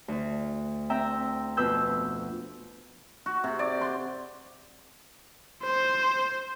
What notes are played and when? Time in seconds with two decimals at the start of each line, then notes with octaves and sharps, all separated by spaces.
0.08 D2
0.90 C4 E5 G5 A#5
1.57 F2 B2 B4 E6 G6
3.26 F#4
3.44 C3
3.59 D5
3.81 C6
5.63 C5